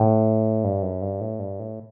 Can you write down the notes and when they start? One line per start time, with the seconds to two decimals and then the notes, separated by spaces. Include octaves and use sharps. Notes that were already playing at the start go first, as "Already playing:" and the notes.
Already playing: A2
0.64 G2
0.82 F#2
1.02 G2
1.21 A2
1.39 G2
1.59 A2